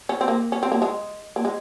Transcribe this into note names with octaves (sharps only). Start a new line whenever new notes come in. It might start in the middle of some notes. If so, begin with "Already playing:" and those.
C#4
C4
A#3
C#4
C4
A#3
G#3
A#3
G#3